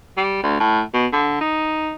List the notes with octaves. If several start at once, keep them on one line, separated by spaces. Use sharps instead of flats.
G3
D2
A2
B2
D3
D#4